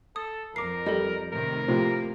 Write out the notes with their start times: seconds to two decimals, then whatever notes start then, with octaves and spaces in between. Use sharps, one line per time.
0.16 A4 D#6
0.56 F2 A#4 D6 C7
0.86 G3 A4 D5 D#5
1.33 A2 C3 D#3 A#4
1.68 A2 C3 F3 A#3